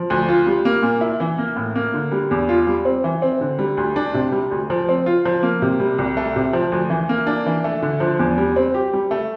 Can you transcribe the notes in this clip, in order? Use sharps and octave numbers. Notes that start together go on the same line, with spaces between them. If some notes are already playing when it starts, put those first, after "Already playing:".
Already playing: F3
D2
F4
G3
A#3
A#2
E4
E3
A#3
A2
A#3
D3
G3
E2
F4
G3
C4
E3
C4
D3
G3
D2
D4
C3
G3
D2
F3
C4
F4
F3
A#3
C3
G3
C2
A3
C3
F3
D2
E3
A#3
D4
E3
A3
D3
F3
E2
G3
C4
G4
G3
A3